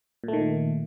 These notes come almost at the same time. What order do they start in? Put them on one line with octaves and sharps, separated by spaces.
A#2 A3 D#3